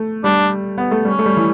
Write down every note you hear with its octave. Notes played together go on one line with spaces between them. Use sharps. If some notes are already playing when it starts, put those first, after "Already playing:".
Already playing: A3
G3 D4
B3
A3
G3 C#4
A3
G3
E3